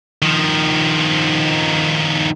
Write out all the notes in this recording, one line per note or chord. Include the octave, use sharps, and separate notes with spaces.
D#3 F3